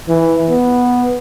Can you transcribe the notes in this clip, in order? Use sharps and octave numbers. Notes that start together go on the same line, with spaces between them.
E3
B3